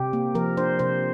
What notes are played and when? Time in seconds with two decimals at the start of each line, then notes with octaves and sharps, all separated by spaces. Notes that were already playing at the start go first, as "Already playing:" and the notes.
Already playing: C3 G4
0.13 A#3
0.35 F3 A#4
0.57 D4 C5
0.79 C3 C5